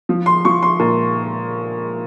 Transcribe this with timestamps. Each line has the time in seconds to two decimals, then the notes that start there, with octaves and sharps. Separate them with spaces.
0.09 F3
0.26 C6
0.45 F3 C#6
0.63 C6
0.79 A#2